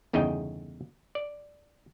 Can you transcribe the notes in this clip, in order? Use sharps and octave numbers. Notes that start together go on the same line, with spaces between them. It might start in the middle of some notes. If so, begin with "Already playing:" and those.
G1 E2 C#3 D#4 D#5 G5
D5